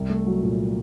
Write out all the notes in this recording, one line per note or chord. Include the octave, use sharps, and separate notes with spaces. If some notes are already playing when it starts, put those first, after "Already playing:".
Already playing: C2
A3
F#3
A#2